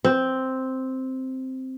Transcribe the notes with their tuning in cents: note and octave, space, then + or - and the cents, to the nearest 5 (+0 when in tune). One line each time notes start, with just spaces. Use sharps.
C4 +0